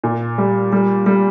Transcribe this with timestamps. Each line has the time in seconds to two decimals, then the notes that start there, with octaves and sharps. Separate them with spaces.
0.04 A#2
0.38 G3
0.72 G3
1.06 G3